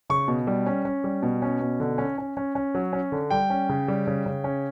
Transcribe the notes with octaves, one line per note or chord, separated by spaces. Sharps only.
C#3 C#6
B2
G3
C#4
C#4
G3
B2
C#4
B2
D3
C#4
C#4
C#4
C#4
F#3
C#4
D3
G3 G5
C#4
C#3
G3
C#3
C#3
C#4